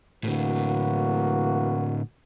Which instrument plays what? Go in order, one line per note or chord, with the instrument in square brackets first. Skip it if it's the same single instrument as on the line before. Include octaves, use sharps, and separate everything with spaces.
[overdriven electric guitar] A2 D3 [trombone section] E3 A#3 F#4